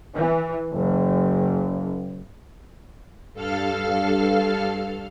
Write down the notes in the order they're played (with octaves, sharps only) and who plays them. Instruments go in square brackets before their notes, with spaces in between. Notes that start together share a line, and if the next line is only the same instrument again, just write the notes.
[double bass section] E3
F#1
[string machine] G2 A4 F5 F6